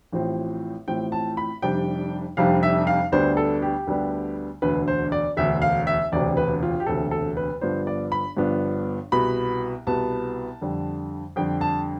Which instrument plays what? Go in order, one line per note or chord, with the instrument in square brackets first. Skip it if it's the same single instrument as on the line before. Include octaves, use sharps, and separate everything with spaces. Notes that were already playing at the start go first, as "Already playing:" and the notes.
[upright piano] A1 A2 F3 C4
A1 A2 F3 C4 G5
A5
B5
F1 F2 C3 G3 D4 G5
F1 F2 C3 G3 D4 F5
E5
F5
D2 D3 G3 B3 D4 C5
A4
G4
D2 D3 G3 B3 D4
E1 D2 D3 B4
C5
D5
E1 D2 D3 E5
F5
E5
E1 D2 C3 D5
B4
F4
G4
E1 D2 C3 A4
A4
B4
G1 G2 F3 B3 D4 C5
D5
B5
G1 G2 F3 B3 D4
C2 B2 B3 B5
C2 B2 B3 A5
F2 D3 G3
F2 D3 G3 G5
A5